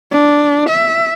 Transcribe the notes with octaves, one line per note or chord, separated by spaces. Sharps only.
D4
E5